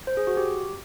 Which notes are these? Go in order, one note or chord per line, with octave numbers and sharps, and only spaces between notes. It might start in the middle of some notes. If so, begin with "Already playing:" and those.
C5
G#4
F#4
G4